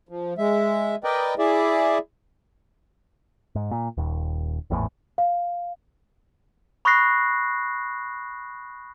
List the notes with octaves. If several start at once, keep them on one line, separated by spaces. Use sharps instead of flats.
F3
G#3 E5
A#4 B4 D5 D#5 G5
E4 G#4 D5 E5
G#2
A#2
D#1 D#2
G#1 E2 A2
F5
B5 C#6 D#6 F#6 A#6 C7